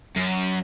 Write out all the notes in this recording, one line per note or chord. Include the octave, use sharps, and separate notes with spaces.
F#2